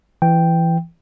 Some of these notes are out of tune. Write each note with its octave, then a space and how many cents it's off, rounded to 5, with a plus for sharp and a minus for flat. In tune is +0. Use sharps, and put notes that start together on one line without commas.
E3 +20 G5 +0